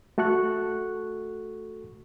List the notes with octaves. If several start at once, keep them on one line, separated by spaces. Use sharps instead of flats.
A3 F#4 A4 C#6 F#6